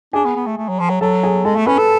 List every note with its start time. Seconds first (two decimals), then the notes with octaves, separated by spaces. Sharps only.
0.13 D4 G#4 G#5
0.25 B3
0.36 B3
0.46 A3
0.58 A3
0.69 F#3
0.79 F3
0.90 F#3
1.01 F#3 A4 A5
1.23 G#4 G#5
1.45 G#3 A4 A5
1.56 A3
1.67 C#4 B4 B5
1.78 A4